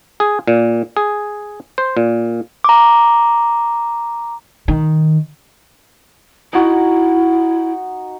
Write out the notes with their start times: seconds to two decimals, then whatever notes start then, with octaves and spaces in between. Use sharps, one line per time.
0.20 G#4
0.47 A#2
0.97 G#4
1.78 C5
1.97 A#2
2.64 A#5 D6
4.68 D#3
6.53 D#4 E4 F#4